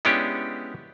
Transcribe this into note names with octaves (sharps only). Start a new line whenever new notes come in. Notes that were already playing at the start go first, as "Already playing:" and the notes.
G#3 B3 C#4 D4 E4 G4